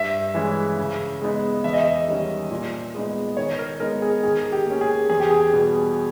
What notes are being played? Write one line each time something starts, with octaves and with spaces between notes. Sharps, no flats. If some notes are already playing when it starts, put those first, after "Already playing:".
Already playing: G2 E5
E3 G#3 C#4
C#3
G#3 B3 D#4
E2 E5
D#5
E5
D#3 G3 C#4
A#2
G#3 B3 D#4
D#3 C#5
A#4
G#3 B3 D#4 A#4
G#4
D#3 G#4
G4
A#3 C#4
G#4
E2 G#4
G4
G#4
B2 G3 B3